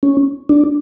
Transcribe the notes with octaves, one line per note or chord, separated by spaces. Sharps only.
C#4
D4